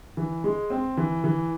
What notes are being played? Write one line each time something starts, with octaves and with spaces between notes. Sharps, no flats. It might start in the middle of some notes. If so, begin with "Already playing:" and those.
E3
G#3
C4
E3
E3